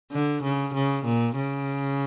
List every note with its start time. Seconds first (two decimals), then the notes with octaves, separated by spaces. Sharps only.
0.12 D3
0.43 C#3
0.74 C#3
1.05 A#2
1.36 C#3